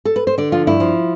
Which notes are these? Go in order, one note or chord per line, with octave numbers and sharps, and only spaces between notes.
A4
B4
C5
D3 D5
F3 F4
G2 E4
F3